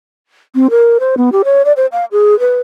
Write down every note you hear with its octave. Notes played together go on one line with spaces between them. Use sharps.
C4
A#4
C5
B3
G4
C#5
D5
C5
F5
G#4
B4